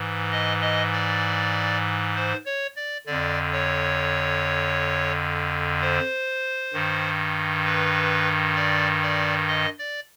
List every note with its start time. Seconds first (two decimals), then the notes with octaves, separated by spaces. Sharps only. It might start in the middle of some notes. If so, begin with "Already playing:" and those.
Already playing: G#2 E3
0.32 D#5
0.61 D#5
0.92 D5
2.15 C5
2.46 C#5
2.76 D5
3.06 F2 D3 D5
3.52 C#5
5.81 C5
6.73 G2 D#3
7.64 B4
8.55 D5
9.02 D5
9.48 D#5
9.79 D5